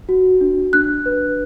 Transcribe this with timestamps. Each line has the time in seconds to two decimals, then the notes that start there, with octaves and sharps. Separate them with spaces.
0.09 F#4
0.41 D4
0.73 D4 F#6
1.06 B4